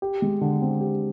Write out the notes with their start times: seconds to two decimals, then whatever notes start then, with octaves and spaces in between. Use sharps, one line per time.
0.02 G4
0.22 G#3
0.41 D3
0.62 C4
0.80 G4